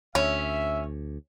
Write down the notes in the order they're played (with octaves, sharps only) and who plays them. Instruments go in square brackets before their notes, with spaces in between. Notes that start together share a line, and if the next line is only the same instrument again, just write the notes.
[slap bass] D2 [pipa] C#4 [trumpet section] E5